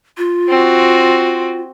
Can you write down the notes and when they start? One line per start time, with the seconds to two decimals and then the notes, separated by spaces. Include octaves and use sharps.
0.18 F4
0.49 C4 F#4